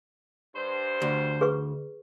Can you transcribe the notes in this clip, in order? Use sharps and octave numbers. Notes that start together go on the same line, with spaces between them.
G2 C5
D2
G#4 B4 C#6